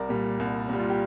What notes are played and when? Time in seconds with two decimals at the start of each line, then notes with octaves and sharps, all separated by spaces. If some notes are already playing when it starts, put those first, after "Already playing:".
Already playing: C2 A#4 D5
0.09 A#2 G3
0.40 C2
0.69 A#2 G3
0.80 F4
0.90 G4